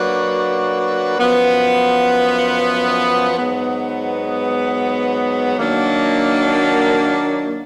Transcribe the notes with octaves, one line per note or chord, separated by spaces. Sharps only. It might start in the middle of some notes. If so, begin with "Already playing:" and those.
Already playing: F#3 A#3 D4 F#4 B4
F#2 F3 B3
G#2 F#3 B3
D#3 F#3 A#3 D4 F#4